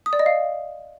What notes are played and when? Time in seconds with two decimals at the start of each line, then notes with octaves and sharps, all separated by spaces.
0.06 D#6
0.13 D5
0.19 D#5
0.26 F5